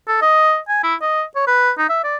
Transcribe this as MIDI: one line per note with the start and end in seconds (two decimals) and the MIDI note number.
0.08 0.21 69
0.22 0.58 75
0.69 0.83 80
0.84 0.95 64
1.02 1.23 75
1.36 1.43 73
1.47 1.71 71
1.78 1.87 63
1.90 2.02 76
2.04 2.17 74